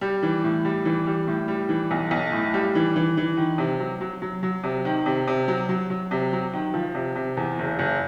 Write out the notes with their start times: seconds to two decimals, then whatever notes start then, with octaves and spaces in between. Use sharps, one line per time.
0.01 G3
0.23 E3
0.44 A2
0.65 G3
0.85 E3
1.07 G3
1.27 A2
1.48 G3
1.69 E3
1.91 B1
2.11 B1
2.32 A2
2.54 G3
2.75 E3
2.96 E3
3.17 E3
3.37 D#3
3.58 C3
3.80 F#3
4.01 F#3
4.22 F#3
4.43 F#3
4.64 C3
4.85 D#3
5.06 C3
5.28 C3
5.48 F#3
5.69 F#3
5.90 F#3
6.11 C3
6.33 F#3
6.53 D#3
6.74 F3
6.95 C3
7.16 C3
7.37 E2
7.59 F#1
7.79 F#1